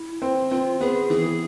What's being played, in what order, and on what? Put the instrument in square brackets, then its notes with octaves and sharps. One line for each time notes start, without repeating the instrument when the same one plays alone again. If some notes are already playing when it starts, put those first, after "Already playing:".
Already playing: [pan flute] E4
[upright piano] C4
[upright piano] C4 [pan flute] F4
[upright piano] B3 [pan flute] G#4
[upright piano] E3 [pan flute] G#4